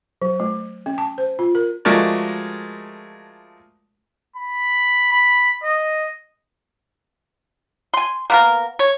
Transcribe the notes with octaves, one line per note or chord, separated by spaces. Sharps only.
F#3
A3
C#4
A5
C5
F4
A#4
F3 G#3 A3 F#4 A#4 D5
B5
B5
D#5
G#5 C6
A#3 B3 A#4
C#5